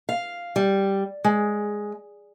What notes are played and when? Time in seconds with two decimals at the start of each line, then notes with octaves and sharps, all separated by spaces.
0.09 F5
0.56 G3
1.24 G#3